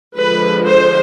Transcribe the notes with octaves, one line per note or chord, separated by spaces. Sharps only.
D3 F3 G#3 B4
C5